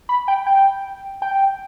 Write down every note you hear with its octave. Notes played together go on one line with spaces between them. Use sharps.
B5
G5
G5
G5